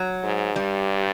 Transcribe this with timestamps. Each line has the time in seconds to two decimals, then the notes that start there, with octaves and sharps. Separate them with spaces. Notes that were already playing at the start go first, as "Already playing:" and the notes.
Already playing: F#3
0.23 G#2
0.56 G2 G3